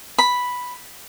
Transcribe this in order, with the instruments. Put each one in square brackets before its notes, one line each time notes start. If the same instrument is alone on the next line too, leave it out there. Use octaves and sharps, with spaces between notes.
[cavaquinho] B5